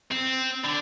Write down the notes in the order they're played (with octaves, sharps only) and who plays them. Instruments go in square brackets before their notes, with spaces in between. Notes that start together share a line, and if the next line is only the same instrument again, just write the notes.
[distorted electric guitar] C4
D3